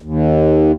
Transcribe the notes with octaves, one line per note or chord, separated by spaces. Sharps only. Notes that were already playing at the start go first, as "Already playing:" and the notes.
D#2